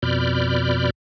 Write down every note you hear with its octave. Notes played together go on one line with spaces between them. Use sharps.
F2 B2 D5 B5 F6 G6